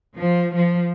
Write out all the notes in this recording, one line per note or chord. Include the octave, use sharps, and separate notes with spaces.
F3
F3